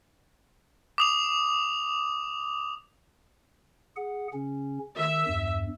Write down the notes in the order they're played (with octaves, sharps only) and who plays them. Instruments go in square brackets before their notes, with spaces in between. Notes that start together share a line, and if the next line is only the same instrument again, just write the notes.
[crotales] D6 D#6 F7
[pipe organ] G#4 F#5
C#3 C#4
[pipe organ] D#3 [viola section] E5
[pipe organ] E2 G2